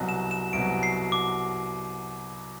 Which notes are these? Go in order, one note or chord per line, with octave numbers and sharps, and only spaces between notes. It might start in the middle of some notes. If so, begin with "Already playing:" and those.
Already playing: C2 B2 F#3
E7
E7
C2 B2 F#3 D7
C7
D6